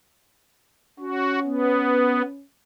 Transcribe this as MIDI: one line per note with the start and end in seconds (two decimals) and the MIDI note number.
0.99 2.44 61
0.99 1.39 66
1.45 2.22 59